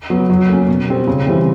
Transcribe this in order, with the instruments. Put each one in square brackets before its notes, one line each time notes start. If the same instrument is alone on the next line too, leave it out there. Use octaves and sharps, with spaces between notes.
[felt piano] F#3 B3
F#3
A#3 C#4
B2
G3 C4
C#3
E3 G3 C4